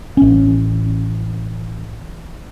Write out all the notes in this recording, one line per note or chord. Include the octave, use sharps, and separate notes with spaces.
A1 C#4